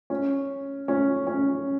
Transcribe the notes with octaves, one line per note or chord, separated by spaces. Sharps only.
C#4
C#4
C#4